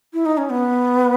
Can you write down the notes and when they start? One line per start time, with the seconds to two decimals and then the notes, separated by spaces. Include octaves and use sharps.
0.14 E4
0.26 D#4
0.38 C#4
0.50 B3